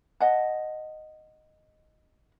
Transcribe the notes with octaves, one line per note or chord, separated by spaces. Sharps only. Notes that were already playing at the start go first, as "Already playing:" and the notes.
D#5 F#5 A5